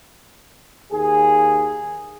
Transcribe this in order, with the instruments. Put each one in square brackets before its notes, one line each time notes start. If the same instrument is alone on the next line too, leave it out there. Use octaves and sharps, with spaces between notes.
[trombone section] D#2 G#4